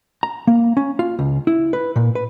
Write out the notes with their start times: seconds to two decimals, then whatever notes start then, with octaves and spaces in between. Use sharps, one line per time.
0.23 A#5
0.47 A#3
0.77 C#4
0.99 F4
1.19 C#2
1.47 E4
1.73 B4
1.96 A#2
2.15 B4